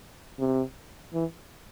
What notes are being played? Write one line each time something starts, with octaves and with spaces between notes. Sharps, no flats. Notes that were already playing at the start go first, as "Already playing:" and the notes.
C3
E3